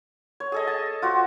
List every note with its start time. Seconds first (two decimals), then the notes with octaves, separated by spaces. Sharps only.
0.40 C#5
0.52 G#4 A4 D#5
0.67 A5
1.02 F4 F#4 C5